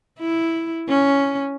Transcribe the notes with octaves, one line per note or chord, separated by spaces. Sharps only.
E4
C#4